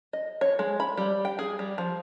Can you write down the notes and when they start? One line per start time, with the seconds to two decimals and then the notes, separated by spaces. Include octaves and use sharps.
0.13 D#5
0.41 C#5
0.59 G#3
0.80 B5
0.97 G3
1.25 G5
1.39 G#4
1.59 G3
1.78 F3